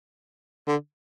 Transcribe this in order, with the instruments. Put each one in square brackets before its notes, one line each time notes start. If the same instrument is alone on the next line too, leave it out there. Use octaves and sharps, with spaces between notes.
[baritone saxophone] D3